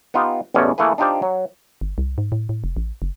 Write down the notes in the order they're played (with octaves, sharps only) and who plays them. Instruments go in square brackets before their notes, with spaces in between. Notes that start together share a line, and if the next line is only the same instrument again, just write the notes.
[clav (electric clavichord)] B3 D#4 F4 G4
A1 E2 B2 C#4 D5
E3 A3 A#3 G#4 B4
D4 D#4 F4 G4 C5 D5
F#3
[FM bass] G1
C2
G#2
A2
A2
F1
A1
F#1